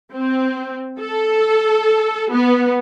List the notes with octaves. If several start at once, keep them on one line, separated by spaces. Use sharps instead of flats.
C4
A4
B3